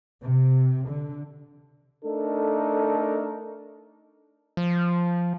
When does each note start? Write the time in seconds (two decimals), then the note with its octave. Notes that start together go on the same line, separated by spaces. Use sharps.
0.21 C3
0.88 D3
2.05 A3 D4 D#4 A4 A#4
4.57 F3